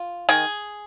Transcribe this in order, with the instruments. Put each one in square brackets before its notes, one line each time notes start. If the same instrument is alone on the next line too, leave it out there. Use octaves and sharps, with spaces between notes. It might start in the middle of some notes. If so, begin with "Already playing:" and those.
Already playing: [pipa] F4
D#3 G#4